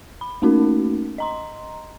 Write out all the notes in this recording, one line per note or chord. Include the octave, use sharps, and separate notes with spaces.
B5
A3 A#3 C#4 D#4 F#4 A#4
D#5 A#5 C6